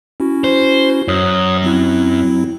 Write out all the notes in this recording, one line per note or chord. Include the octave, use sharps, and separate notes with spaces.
C#4 E4 F#4
C5
F#2 C#5 D#6
F#3 C4 E4